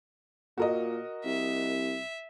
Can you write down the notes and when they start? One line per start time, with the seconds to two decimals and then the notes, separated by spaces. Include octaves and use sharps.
0.58 A#2 F#4 A#4 D#5
1.25 C2 E5